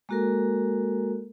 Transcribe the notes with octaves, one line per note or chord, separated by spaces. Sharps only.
G#3 A#3 F#4 A4 A#4